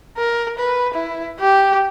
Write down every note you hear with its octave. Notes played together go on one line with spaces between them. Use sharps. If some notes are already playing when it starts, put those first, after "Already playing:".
A#4
B4
E4
G4